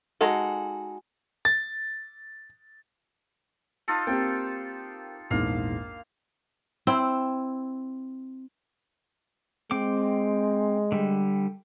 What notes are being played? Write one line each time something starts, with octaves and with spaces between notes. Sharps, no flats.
G#3 D#4 F#4 A4
A6
D#4 F4 A4
A#3 C4 G4 G5
A#1 E2 G#2 A#3 F5
C4 E4
G#3 C4 G5 D6
D3 G3